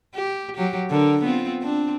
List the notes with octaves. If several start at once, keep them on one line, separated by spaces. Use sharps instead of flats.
G4
F#3 G4
D3 A#4
B3 C4 F4
C4 D4